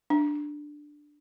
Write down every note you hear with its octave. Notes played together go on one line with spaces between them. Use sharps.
D4